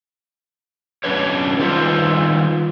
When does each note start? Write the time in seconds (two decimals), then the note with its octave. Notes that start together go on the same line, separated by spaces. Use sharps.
1.04 F#3 C#4 D4 B4 C#5
1.59 D#3 G3 F4 A4 B4 C5